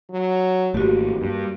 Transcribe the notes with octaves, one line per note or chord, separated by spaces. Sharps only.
F#3
G#1 A3 A#3 F#4 G4
G2